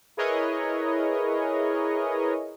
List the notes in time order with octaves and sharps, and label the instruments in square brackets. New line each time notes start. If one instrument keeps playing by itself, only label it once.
[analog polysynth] E4 G#4 A#4 B4 C#5 D#5